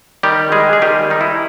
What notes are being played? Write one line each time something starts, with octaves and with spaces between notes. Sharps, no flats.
D#3 G3 G4
G3 G#3 G#4
G#4
D#3 G3 G4
G3 D#4
E4